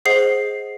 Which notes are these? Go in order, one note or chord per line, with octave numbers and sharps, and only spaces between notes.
G#4 C5 D#5 F#5 C7